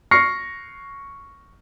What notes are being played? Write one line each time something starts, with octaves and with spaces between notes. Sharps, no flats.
C#6 F6 A#6 C7 C#7